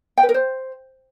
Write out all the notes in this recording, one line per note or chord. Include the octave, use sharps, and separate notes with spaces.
G5
B4
A#4
C5